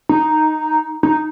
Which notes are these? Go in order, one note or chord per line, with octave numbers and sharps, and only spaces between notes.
D#4
D#4